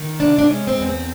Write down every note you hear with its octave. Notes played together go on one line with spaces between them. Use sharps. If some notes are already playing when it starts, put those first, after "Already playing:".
Already playing: D#3
C3 D4
D4
G#3 C#4
C4
E2
C4